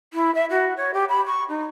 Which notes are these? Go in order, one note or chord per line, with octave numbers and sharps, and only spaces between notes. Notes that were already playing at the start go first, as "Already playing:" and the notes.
E4
E5
F#4
C#5
G4
B5
C#6
D#4